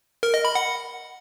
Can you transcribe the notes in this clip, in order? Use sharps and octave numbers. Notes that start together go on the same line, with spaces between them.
A#4
D#5
B5
F#5